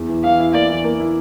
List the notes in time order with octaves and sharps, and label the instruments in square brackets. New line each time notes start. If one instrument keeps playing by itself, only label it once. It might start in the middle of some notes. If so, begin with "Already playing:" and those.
Already playing: [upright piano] E2
E3
[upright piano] E3 [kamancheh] F5
[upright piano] E4
[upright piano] A#3 [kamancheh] D5
[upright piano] E3
A#3
E4